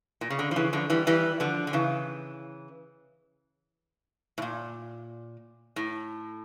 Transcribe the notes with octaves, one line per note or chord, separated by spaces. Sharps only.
A#2
C#3
D3
F3
C#3 E3
D3 F3
E3 G3
E3 G3
D3 F3
D3
C#3 E3
A2
A#2
A2